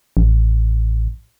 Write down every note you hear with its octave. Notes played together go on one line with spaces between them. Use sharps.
A1